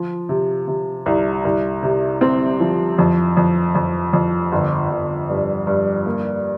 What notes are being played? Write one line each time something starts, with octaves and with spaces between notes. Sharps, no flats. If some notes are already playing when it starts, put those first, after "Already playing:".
Already playing: F3
C3
C3
C2
C2
C3
C4
F3
F2
F2
F2
F2
G1
G1
G2
G2
A#3